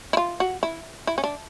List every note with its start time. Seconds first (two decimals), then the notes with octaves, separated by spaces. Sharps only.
0.13 E4
0.17 F4
0.40 F#4
0.63 E4
1.07 E4
1.18 C#4
1.24 D4